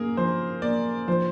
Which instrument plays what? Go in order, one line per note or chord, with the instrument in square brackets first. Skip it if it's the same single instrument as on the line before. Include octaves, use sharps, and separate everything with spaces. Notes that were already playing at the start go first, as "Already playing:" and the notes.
Already playing: [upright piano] A#3 [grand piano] G#4 A#4
[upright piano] F3 [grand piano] C5
[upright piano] A#3 [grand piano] D5
[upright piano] F3 [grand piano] C5